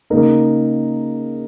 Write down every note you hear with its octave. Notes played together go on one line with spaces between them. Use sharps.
C#3 A#3 D#4 A#4